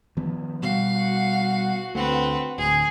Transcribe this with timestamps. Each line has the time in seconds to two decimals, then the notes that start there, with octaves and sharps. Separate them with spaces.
0.17 D#3 F3 B3
0.62 B2 G3 F#4 F5
0.96 F#4 F#5
1.95 D2 A3 C4 B4
2.58 D1 D2 G#4